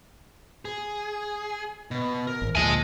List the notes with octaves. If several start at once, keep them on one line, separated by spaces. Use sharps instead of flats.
G#4
B2
A#4
G#1
D2 A#2 F3 D#5 E5 G#5 A5